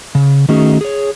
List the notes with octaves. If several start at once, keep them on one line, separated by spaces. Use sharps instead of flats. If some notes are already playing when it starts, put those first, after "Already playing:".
C#3
D#3 A3 C#4 D#4 F#4 G#4
G#4 C#5